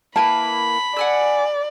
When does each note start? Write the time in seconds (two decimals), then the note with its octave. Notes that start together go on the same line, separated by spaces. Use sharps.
0.16 A#3 E4 B4 A5 B5
0.96 D5 F#5 G#5 E6